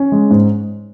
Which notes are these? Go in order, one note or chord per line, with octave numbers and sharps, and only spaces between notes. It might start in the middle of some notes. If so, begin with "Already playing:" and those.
Already playing: C#4
G#3
G#2